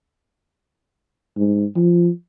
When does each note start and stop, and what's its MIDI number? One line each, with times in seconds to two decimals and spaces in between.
1.37 1.65 44
1.76 2.09 53